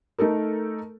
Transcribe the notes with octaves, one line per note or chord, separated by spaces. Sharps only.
A3 D#4 A4 A#4